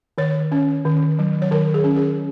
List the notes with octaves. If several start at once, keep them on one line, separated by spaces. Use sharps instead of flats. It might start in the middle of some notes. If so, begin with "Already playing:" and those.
D#3 C#5
C#4
D#3
F#3
C#5
D#3 A#4
G#4
C#4
G#4